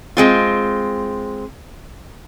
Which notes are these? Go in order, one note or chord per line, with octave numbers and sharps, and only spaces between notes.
G#3 C4 F4